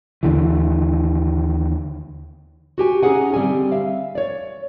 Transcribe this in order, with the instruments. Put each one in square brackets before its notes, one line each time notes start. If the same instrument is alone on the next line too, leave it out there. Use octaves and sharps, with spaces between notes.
[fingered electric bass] D#2 D3 E3
[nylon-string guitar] F#4 G4 G#5
C#4 D#4 G#4 F#5 G#5
D3 G3 C4 G4 G#5
E5 F5
C#5 D5